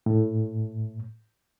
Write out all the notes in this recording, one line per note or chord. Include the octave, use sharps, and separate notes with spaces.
A2